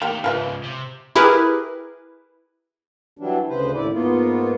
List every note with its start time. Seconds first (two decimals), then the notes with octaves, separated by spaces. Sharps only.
0.02 D#3 A3 A#3 G4
0.24 G#2 C#3 F4 B4 E5
0.63 C3
1.15 E4 G4 G#4 A#4 B4
3.18 E3 F#3 G3 D4
3.49 D2 C#3 B4 C5
3.74 D#2 A2 E4 D5
3.93 G#2 A#3 B3 F4